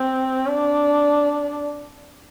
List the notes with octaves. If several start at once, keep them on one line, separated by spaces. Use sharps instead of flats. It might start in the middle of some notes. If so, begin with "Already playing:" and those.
Already playing: C4
D4